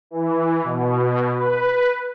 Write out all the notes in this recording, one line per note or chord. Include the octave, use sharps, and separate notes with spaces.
E3
B2
B4